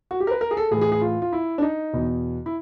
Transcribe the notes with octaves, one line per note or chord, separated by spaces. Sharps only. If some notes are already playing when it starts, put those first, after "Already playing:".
F#4
G4
A#4
B4
A#4
G#4
A4
A2 E3 G#4
G#4
G#4
F4
F4
E4
D4
D#4
E2 B2
E4